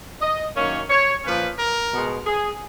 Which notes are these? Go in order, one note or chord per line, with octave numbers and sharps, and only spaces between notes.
D#5
F#2 D#3 A#3 C#4 C#5
C#5
A#2 F3 A#3 C#4 B4
A#4
B2 G#3 B3
G#4